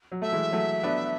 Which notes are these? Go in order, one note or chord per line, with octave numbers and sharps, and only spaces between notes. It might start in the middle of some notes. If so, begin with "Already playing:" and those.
F#3
A3 E5
E3 G#3
F#3 A3
B3 D4